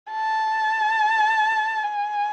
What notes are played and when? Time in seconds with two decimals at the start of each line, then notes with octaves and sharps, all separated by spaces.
0.12 A5
1.84 G#5